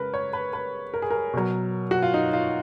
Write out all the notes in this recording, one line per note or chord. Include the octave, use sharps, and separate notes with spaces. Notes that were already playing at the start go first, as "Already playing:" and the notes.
Already playing: C#3 G#3 A#4 B4
C#5
B4
B4
A#4
G#4
A#4
B2 F#3
F#4
F4
D#4
F4